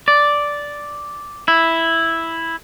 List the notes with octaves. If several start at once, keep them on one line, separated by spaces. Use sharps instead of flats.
D5
E4